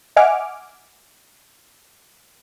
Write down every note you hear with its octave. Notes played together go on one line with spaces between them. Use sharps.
D#5 E5 F#5 G#5 D6 F6